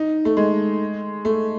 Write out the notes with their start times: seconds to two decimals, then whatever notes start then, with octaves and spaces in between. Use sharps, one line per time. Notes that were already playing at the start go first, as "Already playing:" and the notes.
Already playing: D#4
0.25 A3
0.37 G#3
1.25 A3